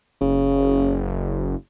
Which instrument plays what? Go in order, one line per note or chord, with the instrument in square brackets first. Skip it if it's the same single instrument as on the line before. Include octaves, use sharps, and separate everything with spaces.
[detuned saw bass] F#1 [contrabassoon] C#3